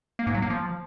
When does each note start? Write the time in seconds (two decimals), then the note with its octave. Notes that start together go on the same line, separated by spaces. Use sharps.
0.19 A#3
0.27 G#2
0.35 F#3
0.42 A#3
0.50 F3